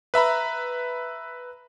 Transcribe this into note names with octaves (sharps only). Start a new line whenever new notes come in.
B4 E5 A#5 B5